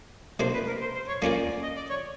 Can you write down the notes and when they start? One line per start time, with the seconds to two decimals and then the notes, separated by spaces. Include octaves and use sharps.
0.40 C3 F3 A#3 D4 C5
0.54 B4
0.67 A#4
0.81 C5
0.95 C5
1.08 C#5
1.22 F3 A#3 C#4 F4 A#4 D5
1.63 D#5
1.76 D5
1.90 C#5